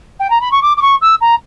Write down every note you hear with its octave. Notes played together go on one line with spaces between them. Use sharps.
G5
A#5
B5
C#6
D6
D6
C#6
E6
A#5